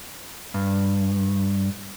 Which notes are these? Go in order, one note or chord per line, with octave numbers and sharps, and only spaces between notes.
G2